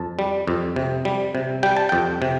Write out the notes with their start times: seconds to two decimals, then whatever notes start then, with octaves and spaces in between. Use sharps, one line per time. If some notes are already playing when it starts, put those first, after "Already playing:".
Already playing: F2 A5
0.19 G3
0.48 F2
0.76 C3
1.05 G3
1.35 C3
1.63 G3 G5
1.77 A5
1.89 F2 G5
2.22 C3